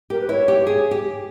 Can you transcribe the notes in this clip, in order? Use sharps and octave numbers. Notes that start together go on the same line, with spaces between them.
G4 A#4
B4
E4 C#5
G4
G#4
G4